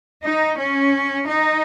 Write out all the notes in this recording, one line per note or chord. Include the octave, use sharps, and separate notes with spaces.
D#4
C#4
D#4